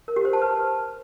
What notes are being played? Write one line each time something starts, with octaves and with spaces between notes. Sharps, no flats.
A#4
G4
C5
A5
B4